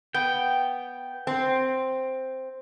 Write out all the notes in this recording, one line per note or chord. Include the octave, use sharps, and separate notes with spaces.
B3 G5
C4